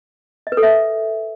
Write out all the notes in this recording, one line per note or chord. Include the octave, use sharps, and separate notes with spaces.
D#5
B4
A4
E5